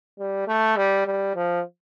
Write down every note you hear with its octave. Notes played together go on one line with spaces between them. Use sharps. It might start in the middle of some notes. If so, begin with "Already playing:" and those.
G3
A3
G3
G3
F3